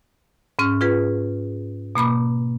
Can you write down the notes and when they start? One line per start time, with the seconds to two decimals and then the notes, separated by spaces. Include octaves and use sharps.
0.59 G#2 C#4 F6
0.81 F4 G#4 B4
1.95 B2 A#3 B5 D6